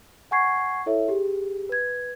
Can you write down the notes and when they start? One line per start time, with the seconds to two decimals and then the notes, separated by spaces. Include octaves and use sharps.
0.31 F#5 G#5 C#6 G#6 C7
0.86 E4 A4 C#5 E5
1.08 G4 G#4
1.69 B4 G#6